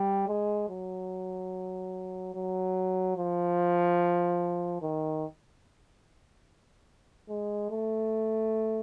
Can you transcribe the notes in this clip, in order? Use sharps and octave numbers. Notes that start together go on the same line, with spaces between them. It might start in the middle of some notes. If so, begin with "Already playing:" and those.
Already playing: G3
G#3
F#3
F#3
F3
D#3
G#3
A3